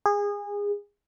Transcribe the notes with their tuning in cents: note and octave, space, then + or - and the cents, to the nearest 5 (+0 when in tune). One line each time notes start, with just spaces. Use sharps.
G#4 -25